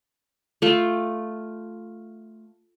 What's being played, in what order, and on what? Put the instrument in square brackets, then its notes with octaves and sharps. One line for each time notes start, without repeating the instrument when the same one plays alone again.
[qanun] A3 F4